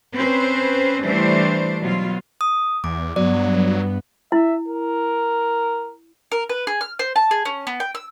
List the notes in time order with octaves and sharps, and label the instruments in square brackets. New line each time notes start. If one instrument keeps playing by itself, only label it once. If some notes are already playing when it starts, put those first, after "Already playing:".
[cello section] C4 C#4 B4 C5
E3 G3 A3 D4 C5
B2 F#3 F4
[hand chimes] D#6
[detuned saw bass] E2 [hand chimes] D6
[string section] G2 B3 [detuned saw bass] F#3 [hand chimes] D5
[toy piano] E4 [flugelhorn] E5
[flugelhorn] A#4
[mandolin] A#4
B4
G#4
F6
C5
A5
G#4
C#4
B3
G5
E6